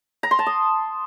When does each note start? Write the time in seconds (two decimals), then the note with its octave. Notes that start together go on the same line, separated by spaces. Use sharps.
0.23 A#5
0.31 C6
0.39 A5
0.46 D#6